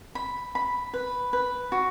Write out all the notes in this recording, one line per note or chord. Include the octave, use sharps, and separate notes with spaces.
B5
B5
B4
B4
F#4